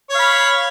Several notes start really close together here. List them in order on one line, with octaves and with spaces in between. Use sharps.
C#5 F5 B5